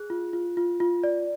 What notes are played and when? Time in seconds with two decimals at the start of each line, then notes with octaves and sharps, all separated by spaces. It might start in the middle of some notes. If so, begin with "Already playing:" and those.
Already playing: G#4 F#6
0.10 F4
0.33 F4
0.57 F4
0.80 F4
1.04 D5